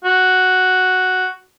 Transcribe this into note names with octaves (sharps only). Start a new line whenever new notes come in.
F#4